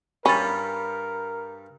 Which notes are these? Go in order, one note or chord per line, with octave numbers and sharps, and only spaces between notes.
G2 G3 C#4 A#4 B5 A6